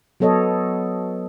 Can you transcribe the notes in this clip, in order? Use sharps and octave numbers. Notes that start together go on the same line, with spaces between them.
F#3 B3 A4 C#5 D#5